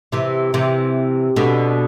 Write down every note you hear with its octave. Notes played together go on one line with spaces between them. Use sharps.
C3 E3
C3 E3
B2 D3